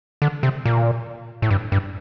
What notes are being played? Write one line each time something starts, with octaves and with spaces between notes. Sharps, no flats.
D3
C3
A#2
A2
G2
G2